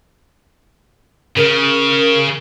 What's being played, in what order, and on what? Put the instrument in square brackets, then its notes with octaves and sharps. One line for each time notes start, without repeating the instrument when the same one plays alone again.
[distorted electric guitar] C#3 [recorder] A#4